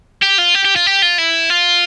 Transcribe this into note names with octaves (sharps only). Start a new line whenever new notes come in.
G4
F4
G4
G4
F4
G4
F4
E4
F4